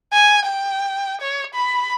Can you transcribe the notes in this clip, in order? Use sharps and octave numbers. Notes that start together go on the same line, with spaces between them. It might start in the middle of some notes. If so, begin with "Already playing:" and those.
G#5
G5
C#5
B5